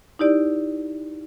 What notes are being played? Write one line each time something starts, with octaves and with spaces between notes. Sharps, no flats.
D#4 E4 G4 D5